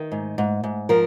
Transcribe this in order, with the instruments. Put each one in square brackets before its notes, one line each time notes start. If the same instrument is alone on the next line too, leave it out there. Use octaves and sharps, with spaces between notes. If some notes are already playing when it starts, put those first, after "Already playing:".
Already playing: [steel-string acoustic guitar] D#3
G#2
G#2
G#2
F3 A#4